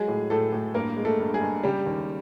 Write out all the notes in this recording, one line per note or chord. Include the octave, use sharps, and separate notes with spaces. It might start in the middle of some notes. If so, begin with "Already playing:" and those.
Already playing: F#3 G#3 G#4
A2
A2 A3 A4
A2
G2 A#3 A#4
G#3
A3 A4
G2
G#3 G#4
G2
C#3 G3 G4
D#2